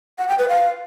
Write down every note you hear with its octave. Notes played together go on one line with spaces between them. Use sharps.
F#5
G5
B4
F5